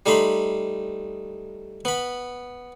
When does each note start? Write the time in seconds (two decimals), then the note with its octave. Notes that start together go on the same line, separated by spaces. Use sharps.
0.06 G3 A3 D#4 B5 C6
1.85 B3 B5